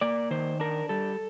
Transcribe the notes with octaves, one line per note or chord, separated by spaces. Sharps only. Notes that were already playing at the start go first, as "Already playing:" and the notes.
A#3 D5
D#3 C5
D4 A#4
G3 A4